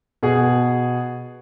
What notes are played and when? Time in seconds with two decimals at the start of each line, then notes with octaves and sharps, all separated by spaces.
0.23 B2 G#4